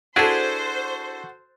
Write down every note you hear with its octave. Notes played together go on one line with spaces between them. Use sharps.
D4 E4 F#4 G#4 A4 C5